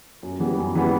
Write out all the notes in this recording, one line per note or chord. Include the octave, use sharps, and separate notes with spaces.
F#2
E3 G3 B3
F#2
E3 G3 B3